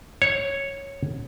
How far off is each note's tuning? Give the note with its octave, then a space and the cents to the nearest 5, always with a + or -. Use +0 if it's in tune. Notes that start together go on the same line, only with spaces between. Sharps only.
C#5 -5